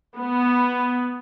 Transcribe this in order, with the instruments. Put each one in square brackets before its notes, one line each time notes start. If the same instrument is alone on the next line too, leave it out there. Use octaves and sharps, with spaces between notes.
[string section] B3